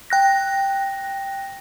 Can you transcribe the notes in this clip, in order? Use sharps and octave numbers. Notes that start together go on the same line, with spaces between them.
G5 F#6 A#6